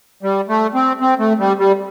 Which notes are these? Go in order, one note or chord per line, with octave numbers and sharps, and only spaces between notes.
G3
A3
C4
C4
A3
G3
G3